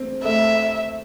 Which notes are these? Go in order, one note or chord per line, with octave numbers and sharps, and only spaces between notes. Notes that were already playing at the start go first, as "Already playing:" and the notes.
Already playing: C4
A3 E5